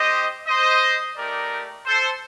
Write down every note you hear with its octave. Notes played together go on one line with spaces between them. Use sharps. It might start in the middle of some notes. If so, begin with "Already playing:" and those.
Already playing: C4 G4 C5 D#5
C5 D#5
A3 D#4 G4 A#4 D5
A4 C5